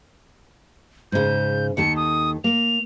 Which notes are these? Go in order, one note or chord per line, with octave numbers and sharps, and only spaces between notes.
G#2 C#3 G6
D#2 D#3 A4 C#7
D#6
A#3 F7